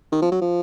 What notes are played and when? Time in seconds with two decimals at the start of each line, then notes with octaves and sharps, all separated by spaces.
0.12 D#3
0.22 F3
0.32 F#3
0.41 F3